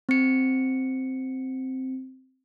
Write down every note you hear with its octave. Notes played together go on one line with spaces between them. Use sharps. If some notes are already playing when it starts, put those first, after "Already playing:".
C4 C#7